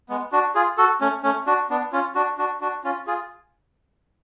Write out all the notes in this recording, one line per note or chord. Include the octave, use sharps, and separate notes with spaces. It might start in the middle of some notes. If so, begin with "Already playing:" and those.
G#3 B3
D4 F#4
F4 G#4
F#4 A4
A3 C#4
A3 C#4
D4 F#4
B3 D4
C#4 F4
D4 F#4
D4 F#4
D4 F#4
C#4 F4
F4 G#4